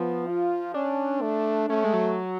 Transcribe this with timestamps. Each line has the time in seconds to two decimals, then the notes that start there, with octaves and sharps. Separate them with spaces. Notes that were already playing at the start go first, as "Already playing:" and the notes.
Already playing: F3 B3
0.28 F4
0.74 C#4 D4
1.22 A3
1.69 A3 C#4
1.84 G#3
1.93 F#3